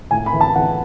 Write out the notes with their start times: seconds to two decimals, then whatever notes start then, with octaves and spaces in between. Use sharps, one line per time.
0.11 A2 G#5
0.26 B5
0.33 E3
0.41 A5
0.55 E3 F#5